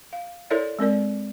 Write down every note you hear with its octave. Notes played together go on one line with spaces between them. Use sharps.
F5
E4 A4 A#4 C#5 D5 E5
G#3 C4 A#4 D5